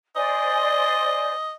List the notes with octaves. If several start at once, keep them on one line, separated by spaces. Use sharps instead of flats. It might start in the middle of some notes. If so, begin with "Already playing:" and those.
C5 D5 D#5 G#5